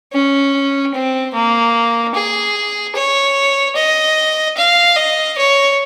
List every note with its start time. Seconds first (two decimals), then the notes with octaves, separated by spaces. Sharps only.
0.13 C#4
0.94 C4
1.34 A#3
2.14 G#4
2.95 C#5
3.76 D#5
4.57 F5
4.96 D#5
5.38 C#5